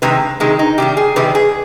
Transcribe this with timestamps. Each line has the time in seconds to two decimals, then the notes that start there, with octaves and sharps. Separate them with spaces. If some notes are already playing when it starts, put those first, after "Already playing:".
0.02 C3 D#3 G#3 B4
0.40 C3 D#3 G#3
0.59 D#4
0.78 C3 D#3 G3 G4
0.97 G#4
1.16 C3 D#3 G3 B4
1.35 G#4